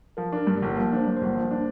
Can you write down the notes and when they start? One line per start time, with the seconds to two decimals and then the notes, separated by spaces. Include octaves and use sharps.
0.17 F3 A#4
0.32 D4 A#4
0.47 G2
0.57 G3
0.63 G1
0.76 F3 A#3
0.92 D4 C5
1.07 G2
1.17 C5
1.22 G1
1.35 F3
1.51 D4